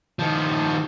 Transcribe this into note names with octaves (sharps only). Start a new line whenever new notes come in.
D#3 F3